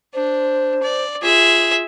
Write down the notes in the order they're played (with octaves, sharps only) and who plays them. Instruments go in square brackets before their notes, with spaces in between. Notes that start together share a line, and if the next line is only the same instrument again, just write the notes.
[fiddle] D4 [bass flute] C5
[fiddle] D5
[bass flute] F4 [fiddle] G#4 E5